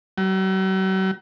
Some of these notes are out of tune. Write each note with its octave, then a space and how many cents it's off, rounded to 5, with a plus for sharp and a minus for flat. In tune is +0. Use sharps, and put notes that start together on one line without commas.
F#3 +45